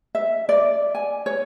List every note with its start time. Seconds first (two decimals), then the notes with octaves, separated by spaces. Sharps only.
0.15 E5
0.49 D5
0.95 G#5
1.26 C#5